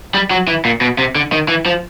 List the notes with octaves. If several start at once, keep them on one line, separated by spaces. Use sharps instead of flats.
G3
F#3
E3
A#2
B2
C3
D3
D#3
E3
F3